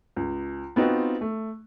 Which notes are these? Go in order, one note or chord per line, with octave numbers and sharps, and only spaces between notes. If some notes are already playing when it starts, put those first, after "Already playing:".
C#2
B3 C4 D#4 F4 F#4
A3